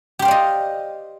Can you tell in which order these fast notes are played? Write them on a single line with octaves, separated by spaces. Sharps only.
G4 C5 F5 D5 D#5